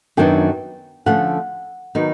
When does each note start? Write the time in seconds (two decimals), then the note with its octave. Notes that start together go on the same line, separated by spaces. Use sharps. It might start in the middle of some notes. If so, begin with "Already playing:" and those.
0.17 F#2 D#3 F#3 B3 D4 G5
1.06 D3 F3 A3 C#4 F4 F#5
1.95 D#3 F#3 B3 D#4